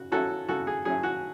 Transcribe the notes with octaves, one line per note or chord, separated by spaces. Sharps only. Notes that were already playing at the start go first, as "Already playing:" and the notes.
Already playing: C#3 F#4
F#3 C#4 E4 F#4 A4
C#3 F#4 A4
G#4
F#3 C#4 E4 G#4
F#4